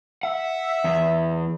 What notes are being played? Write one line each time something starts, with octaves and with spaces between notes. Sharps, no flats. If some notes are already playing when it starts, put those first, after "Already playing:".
E5 F#5
E2